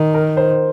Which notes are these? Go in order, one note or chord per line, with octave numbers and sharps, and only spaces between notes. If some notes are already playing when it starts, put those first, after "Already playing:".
Already playing: D#3
A#4
C5